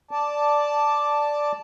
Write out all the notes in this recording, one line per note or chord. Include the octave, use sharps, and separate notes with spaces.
D5 A5